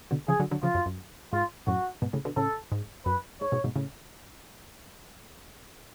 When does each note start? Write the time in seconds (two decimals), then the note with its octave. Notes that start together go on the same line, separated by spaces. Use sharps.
0.11 B2 D3
0.28 C#3 F3 G#4
0.40 D3 F#3
0.51 D3 F#3
0.63 C#3 F3 F4
0.75 F#2
0.86 F#2
1.33 G#2 F4
1.67 F#2 A2 F#4
2.02 G#2 B2
2.13 A2 C#3
2.25 B2 D3
2.36 A2 C#3 A4
2.72 G#2
3.06 F#2 B4
3.41 G#2 C#5
3.52 G#2 B2
3.64 G#2 B2
3.76 A2 C#3